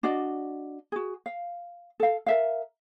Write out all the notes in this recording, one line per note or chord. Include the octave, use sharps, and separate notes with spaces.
D4 F#4 D5 D#5
F#4 G#4
F5
A4 F5
A#4 E5 F5